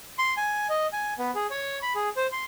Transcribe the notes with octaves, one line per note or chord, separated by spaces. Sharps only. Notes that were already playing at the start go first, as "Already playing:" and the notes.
C6
G#5
D#5
G#5
B3
G#4
C#5
B5
G#4
C5
C6